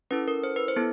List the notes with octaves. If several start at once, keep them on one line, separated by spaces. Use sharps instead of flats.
C#4 E4 A4 B4
A#4
C5
B4
C5
B3 E4 A4